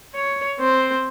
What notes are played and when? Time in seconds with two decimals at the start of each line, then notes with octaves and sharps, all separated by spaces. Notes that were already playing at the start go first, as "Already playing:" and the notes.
0.15 C#5
0.59 C4 C5